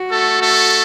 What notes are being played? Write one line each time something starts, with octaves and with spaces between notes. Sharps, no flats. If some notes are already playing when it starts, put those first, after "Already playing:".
Already playing: F#4
A3 A4
A3 A4